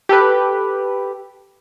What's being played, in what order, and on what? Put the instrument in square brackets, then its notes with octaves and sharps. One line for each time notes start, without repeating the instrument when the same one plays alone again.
[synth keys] G4 A4 B4